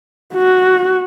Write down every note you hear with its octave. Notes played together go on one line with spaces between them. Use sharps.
F#4